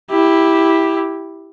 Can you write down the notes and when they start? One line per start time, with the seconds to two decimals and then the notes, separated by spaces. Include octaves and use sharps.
0.11 E4 G4